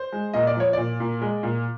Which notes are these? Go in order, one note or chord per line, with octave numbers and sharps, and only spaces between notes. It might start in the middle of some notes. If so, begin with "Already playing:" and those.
Already playing: C5
G#3
A#2 D#5
D5
F3 C#5
A#2 D5
A#2
G#3
A#2